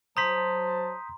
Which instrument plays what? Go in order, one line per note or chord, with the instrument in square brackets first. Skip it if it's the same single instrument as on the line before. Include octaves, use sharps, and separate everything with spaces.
[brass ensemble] F#3 C5 A5 [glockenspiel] A#5 C6 [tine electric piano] D#6 G6 B6